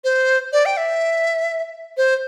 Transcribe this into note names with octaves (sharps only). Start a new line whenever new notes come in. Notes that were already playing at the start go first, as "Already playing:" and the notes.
C5
D5
G5
E5
C5